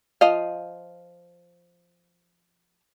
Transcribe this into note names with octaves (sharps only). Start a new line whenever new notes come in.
F3 D#5 F5